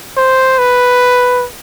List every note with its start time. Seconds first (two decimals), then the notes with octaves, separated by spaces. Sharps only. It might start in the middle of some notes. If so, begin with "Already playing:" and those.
0.17 C5
0.59 B4